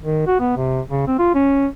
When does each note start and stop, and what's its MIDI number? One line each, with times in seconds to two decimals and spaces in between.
0.02 0.23 51
0.27 0.36 66
0.39 0.55 59
0.56 0.81 48
0.88 1.06 49
1.07 1.19 60
1.19 1.32 65
1.35 1.67 61